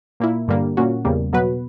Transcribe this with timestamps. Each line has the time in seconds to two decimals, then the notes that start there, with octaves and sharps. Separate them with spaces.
0.20 A#2 A#3 E4
0.48 G2 D3 G3 A#3
0.77 A#2 A#3 C#4 F#4
1.05 E2 C#3 G3 A#3
1.33 B2 F#3 B3 F#4 B4